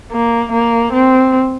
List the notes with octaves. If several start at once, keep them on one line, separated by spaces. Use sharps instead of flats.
A#3
A#3
C4